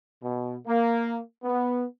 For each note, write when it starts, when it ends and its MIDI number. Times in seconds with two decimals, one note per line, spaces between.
0.22 0.56 47
0.67 1.19 58
1.43 1.85 59